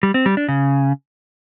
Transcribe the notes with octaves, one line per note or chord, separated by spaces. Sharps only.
G3
C4
G3
D4
C#3